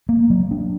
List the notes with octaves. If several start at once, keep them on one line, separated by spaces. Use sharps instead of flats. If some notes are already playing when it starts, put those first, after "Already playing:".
A#3
F#3
D4